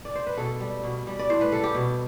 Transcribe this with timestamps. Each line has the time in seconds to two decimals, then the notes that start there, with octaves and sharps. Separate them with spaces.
0.05 D5
0.15 C5
0.27 B4
0.37 B2 A4
0.60 G3
0.84 B2
1.07 G3
1.19 D5
1.29 A2 C5
1.41 B4
1.52 G3 A4
1.64 G4
1.75 B2